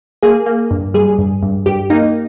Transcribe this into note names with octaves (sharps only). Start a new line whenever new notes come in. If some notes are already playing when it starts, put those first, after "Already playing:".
A#3 G#4
A#3
G2
G3 G#4
G2
G2
G2 G4
A#3 D#4